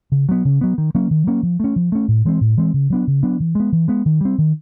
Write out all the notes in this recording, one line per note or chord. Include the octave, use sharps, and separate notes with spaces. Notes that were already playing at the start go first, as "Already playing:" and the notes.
C#3
F#3 B3
C#3
F#3 B3
D#3
F#3 A#3 C#4
D#3
F#3 A#3 C#4
F3
A3 C#4
F3
A3 C#4
A2
E3 G#3 C4
A2
E3 G#3 C4
C#3
F#3 B3 D4
C#3
F#3 B3 D4
E3
G#3 B3
E3
G#3 B3
D#3
G3 C4
D#3